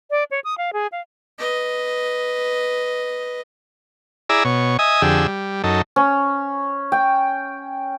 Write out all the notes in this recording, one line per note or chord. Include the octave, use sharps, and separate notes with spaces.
D5
C#5
D#6
F5
G#4
F5
B4 D#5
E4 G#4 D5 A#5 E6
B2 C#5
D#5 E5 G#5 D#6
F2 D3 G4 G#4 E6
G3
F#2 D#4 A4
C#4
G5